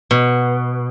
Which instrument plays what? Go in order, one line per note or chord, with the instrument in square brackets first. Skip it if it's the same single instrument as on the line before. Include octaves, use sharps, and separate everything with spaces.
[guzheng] B2